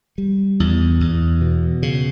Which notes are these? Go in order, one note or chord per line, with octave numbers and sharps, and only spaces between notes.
G3
E2
E2
B2
C#3